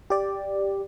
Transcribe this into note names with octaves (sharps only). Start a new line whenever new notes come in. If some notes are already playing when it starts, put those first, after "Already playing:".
G4 D5